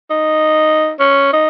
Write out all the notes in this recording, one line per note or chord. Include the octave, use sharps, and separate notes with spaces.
D#4
C#4
D#4